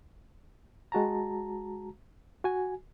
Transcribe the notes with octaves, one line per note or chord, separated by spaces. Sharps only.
G#3 F#4 A5 A#5
F#4 G#5